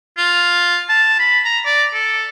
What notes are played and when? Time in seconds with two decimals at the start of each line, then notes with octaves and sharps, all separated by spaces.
0.18 F4
0.89 A5
1.19 B5
1.45 A#5
1.66 D5
1.94 A4